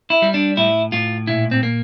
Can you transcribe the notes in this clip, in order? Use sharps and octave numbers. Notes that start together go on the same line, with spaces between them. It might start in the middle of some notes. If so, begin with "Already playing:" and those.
E4
G3
D4
A2 E4
A2 F4
A#2 E4
C4
A#3